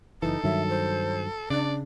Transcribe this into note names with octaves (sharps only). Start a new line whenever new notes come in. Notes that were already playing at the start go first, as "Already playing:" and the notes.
F#1 E3 D#4 A4
G2 D#3 F#3 E5
C5
C#3 D4 D5